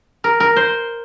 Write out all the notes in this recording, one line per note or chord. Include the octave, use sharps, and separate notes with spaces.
A#4
A#4
C5